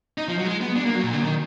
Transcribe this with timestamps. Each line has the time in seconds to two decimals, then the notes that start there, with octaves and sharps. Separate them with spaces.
0.18 D#4
0.28 F3
0.38 F#3
0.46 G#3
0.61 B3
0.76 D4
0.85 A#3
0.95 F#3
1.04 A#2
1.13 D3
1.23 D#3